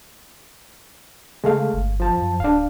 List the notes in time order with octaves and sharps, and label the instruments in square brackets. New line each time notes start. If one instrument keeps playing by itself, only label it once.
[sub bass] C#3 [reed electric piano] G#3 A3 F5
[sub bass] G1
[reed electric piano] F3 A5
[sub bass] F#2
[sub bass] D1 [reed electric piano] D4 F5